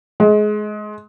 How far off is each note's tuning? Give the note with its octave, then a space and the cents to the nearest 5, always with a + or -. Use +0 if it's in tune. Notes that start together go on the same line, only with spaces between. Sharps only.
G#3 +25